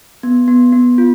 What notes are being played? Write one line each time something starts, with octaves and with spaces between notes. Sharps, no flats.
B3
B3
B3
F4